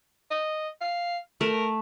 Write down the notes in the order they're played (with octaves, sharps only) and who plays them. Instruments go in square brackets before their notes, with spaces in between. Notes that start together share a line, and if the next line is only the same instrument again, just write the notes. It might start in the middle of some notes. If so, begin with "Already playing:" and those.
[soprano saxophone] D#5
F5
[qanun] A3 [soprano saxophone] A#4